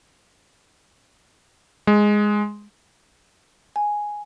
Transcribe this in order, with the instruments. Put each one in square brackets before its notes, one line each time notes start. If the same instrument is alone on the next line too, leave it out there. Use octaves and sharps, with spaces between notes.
[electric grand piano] G#3
[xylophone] G#5